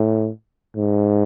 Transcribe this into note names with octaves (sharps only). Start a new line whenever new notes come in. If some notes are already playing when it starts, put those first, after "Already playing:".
Already playing: A2
G#2